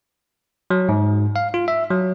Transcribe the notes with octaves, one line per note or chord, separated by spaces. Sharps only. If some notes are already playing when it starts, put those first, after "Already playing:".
F#3
G#2
F5
F4
E5
F#3